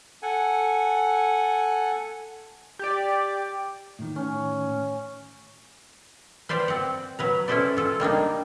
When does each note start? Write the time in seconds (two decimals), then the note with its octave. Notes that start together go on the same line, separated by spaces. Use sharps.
0.23 A4 F#5 G#5
2.79 G4 D5
3.99 A2 D#3
4.16 C#4
6.49 B4 C5 D5 F5 G5
6.68 C4 F#5
7.19 F#3 B4 A#5
7.48 C#4 E4 A4 B4 C5 D5
7.77 F4 A4
8.00 G3 A#3 D4 D#4